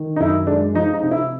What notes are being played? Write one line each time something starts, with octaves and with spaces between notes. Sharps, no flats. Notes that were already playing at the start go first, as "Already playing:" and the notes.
Already playing: D#3
D#4
F#2 E4
G#3 D4
F3 D#4
D#4
C3
E4